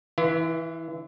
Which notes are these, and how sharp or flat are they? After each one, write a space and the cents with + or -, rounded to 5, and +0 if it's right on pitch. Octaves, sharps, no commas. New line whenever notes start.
E3 -15 E4 +45